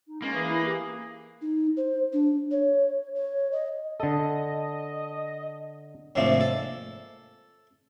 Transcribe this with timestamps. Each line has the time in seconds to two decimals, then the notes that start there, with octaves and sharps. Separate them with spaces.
0.08 D#4
0.22 G#3 A#3 C#4 F4
0.34 E3 G#4
0.48 E4
0.65 G4
1.42 D#4
1.77 C5
2.13 D4
2.51 C#5
3.15 C#5
3.52 D#5
4.00 D3 A4 D#5
6.16 D#2 G#2 C3 F3 A3 D4
6.41 A4